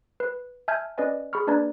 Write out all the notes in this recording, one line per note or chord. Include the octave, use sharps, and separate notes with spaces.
B4
E5 G#5 A5 F6 G6 G#6
C#4 B4 D5 D#5 G#5
G#4 B5 C#6 F6
A#3 D4 B4 D5 A#5 G#6